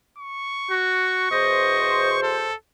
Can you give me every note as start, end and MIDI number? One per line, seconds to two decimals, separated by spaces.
0.18 2.20 85
0.71 1.29 66
1.31 2.51 40
1.31 2.51 47
1.31 2.51 72
1.31 2.19 75
2.22 2.55 69